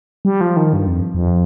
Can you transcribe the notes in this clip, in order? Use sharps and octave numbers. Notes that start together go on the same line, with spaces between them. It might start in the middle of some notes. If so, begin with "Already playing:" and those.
G3
F3
D#3
G2
F2
F2